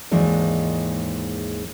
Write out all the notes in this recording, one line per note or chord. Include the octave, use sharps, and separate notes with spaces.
D#2 G#2 E3 G#3 D4